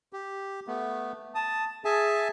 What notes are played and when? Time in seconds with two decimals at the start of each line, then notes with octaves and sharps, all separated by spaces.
0.13 G4
0.67 A3 B3
1.35 A5 D#6
1.85 G#4 E5 G#5 A5